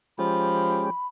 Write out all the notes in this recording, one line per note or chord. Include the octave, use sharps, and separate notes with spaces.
F3 G#3 C#4 G4 B5